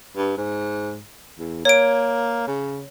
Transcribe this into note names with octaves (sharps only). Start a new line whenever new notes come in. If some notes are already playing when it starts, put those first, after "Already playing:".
G2
G#2
E2
A#3 C#5 D7
C#3